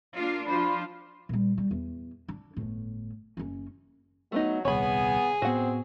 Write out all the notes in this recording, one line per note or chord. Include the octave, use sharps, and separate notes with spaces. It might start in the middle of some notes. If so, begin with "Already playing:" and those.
A#3 D4 F4
F3 D4 F4 C5 B5
A#2 G3
G3
E2
D4
G1 A2
F#1 C#4
F#3 A3 B3 D#4
D#1 C2 B3 G#4 C#5 G#5 B5
A2 B3 C4 F#4 F#5